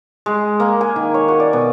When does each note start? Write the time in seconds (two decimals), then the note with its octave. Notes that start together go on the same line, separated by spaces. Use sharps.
0.26 G#3
0.60 A#3
0.81 G#5
0.96 D#3
1.14 C#5
1.28 F#4
1.40 D5
1.53 B2